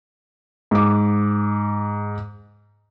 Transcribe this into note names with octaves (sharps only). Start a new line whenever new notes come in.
G#2 D6